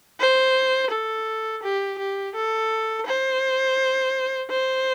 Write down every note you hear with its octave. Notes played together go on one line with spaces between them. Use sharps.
C5
A4
G4
G4
A4
C5
C5